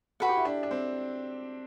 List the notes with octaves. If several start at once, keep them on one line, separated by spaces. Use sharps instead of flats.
F#4 A4 B4 F#5
G4
E4
D4
D4
C4